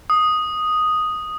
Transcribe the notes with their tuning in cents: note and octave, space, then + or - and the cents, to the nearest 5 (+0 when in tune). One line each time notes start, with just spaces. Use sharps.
D#6 +0